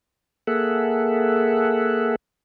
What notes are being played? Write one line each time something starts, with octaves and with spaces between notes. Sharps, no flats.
A#3 G#4 A4 E5 F#5